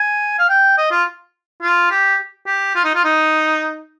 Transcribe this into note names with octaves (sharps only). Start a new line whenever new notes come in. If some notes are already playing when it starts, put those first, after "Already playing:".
Already playing: G#5
F5
G5
D#5
F4
F4
G4
G4
F4
D#4
F4
D#4